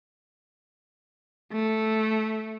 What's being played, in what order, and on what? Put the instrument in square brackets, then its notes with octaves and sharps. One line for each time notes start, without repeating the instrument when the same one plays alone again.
[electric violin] A3